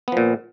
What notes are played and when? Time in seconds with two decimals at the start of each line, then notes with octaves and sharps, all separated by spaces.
0.08 B3
0.12 F3
0.17 A#2